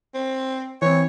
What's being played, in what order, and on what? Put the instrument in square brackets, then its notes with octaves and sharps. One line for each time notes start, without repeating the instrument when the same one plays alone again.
[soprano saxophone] C4
[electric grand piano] E3 C4 [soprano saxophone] C#5